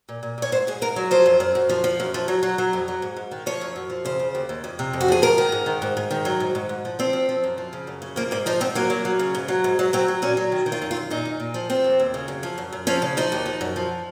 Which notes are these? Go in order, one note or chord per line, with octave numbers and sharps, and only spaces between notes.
A#2
A#2
A#2 C#5
G#2 C5
G#2 G#4
G#2 A#4
F#3
F3 C5
F#2
F#2
F#2
F3
F3
F#2
F3
F#3
F#3
F#3
F2
F#3
G#2
G#2
D#3
F3 C#5
F#2
F#2
F3
C#3 C5
C#3
D#2
D#2
F2
C3
F2
F#4
F3 G#4
G#2 A#4
D#3
G#2
D#3
G#2
G#2
D#3
F#3
G#2
G#2
G#2
F3
F3 C4
F3
F3
F#2
F3
C#3
F#2
C#3
F3 A#3
G#2 A#3
F3 D#4
G#2 C4
F#3 A#3
F#3
F#3
C#3
G#2
F#3
G#2
F#3
F#3 C4
F#3
A#2 C#4
F#3
D#3
D#3
F4
F#2
F4
F#2
A#2 D#4
A#2
A#2
F3
F3 C4
D#2
D#2
C#3
F#2
F3
F#2
F#2
F3 C#4
C#3
F3 D#4
D#2
F3
F#2
F3